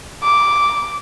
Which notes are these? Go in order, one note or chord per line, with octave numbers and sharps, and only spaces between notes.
D6